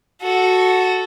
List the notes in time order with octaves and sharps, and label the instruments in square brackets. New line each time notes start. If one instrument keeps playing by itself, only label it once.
[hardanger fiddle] F#4 A4